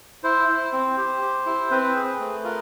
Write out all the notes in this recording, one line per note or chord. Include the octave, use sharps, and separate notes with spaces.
E4 C5
E4
C4
G4
G4
E4
C4 B4
G#4
A3
F4 A#4